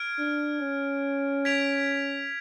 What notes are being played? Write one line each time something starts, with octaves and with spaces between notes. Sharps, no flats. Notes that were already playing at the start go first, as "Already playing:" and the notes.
Already playing: F6 G#6 D7
D4
C#4
G#6 B6 D7 F7